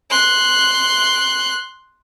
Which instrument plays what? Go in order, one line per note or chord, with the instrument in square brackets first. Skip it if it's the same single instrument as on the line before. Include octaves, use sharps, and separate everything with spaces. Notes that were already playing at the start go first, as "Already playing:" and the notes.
[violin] C6 F#6